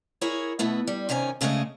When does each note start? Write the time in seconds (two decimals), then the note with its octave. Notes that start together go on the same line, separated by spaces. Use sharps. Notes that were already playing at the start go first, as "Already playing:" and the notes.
0.21 E4 G#4 A#4 C#5
0.59 B2 A3 B3 E4
0.87 G3
1.09 C3 D#3 C#4 D#5 G#5
1.41 D2 C#3 G#3 A3 F#4 D#5